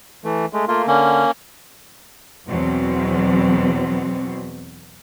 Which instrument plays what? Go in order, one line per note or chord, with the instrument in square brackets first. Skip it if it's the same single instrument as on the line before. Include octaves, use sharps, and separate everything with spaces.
[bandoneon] E3 A3
G#3 A3
[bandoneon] A3 A#3 [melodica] F4
[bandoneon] D3 [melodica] A#3 C#4
[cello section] E2 B2 F#3 C4